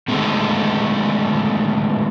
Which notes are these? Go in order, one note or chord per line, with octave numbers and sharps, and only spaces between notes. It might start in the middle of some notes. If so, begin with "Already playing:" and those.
B2 D3 D#3 G#3 A3 C4